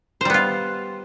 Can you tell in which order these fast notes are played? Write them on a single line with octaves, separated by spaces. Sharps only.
C5 G3 B3 F4